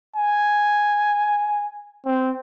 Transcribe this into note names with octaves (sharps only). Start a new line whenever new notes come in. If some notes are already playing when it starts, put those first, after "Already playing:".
G#5
C4